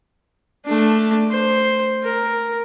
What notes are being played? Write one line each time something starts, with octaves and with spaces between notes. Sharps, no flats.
A3 D4
C5
A#4